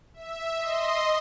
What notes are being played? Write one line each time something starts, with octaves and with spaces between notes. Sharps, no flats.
E5
D#5 C6